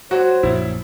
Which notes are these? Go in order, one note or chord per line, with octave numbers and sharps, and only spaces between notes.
F#3 F#4 C5
A#1 F#2 E4